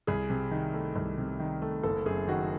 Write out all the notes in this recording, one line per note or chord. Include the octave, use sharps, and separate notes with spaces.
C2 G#4
C3
D#3
A3
C2
C3
D#3
A3
F#1 A4
F#2 G#4
D#3 F#4